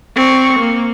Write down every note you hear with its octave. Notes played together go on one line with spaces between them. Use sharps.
C4 C#6
A#3